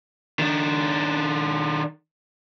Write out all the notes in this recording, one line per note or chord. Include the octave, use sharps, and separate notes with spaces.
D#3 D4